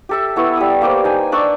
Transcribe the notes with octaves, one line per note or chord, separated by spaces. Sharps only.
G4 A4 E5
B3 E4 C#6 E6
G3 D#6
A#3 G4 C5
D#4 G5 G#5
D4 D5 C#6 E6